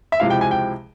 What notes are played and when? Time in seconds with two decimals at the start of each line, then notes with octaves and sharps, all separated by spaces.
0.12 E5
0.20 C#2 C3 F3 G#3 E4 F5
0.30 G5
0.41 G#5
0.51 G5